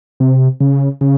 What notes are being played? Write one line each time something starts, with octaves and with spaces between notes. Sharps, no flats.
C3
C#3
C#3